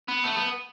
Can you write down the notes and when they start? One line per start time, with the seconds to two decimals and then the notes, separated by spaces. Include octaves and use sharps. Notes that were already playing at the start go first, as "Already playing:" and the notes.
0.08 B3
0.24 A3
0.36 B3